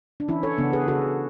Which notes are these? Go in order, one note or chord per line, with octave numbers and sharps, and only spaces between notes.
D4
E3 C#4 E4
A4 C#5
C#3 B3 D4
G#4 B4
C#3 F#4 A4